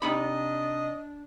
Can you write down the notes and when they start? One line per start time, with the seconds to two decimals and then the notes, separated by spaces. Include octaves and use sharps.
0.02 C3 D4 D#4 D#5 B5